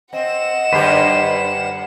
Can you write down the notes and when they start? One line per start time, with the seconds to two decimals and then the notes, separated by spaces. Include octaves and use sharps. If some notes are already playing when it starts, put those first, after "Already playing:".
0.13 C4 D#5 F#5 E7
0.73 F#2 D3 G4 B4 C5 G5